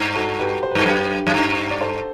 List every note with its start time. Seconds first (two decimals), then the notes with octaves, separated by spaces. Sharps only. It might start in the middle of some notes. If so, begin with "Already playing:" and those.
Already playing: G2
0.15 F#4 A4
0.39 G4 B4
0.63 C5
0.71 B4
0.75 G2 A4
0.86 F#2 G4 B4
1.27 F#2
1.34 G2
1.71 D5
1.81 A4 C5